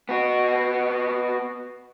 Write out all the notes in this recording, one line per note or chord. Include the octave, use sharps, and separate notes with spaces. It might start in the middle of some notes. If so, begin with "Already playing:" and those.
B3 F#4